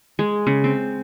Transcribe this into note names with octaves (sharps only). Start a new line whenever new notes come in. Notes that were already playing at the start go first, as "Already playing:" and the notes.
G#3
C#3
C4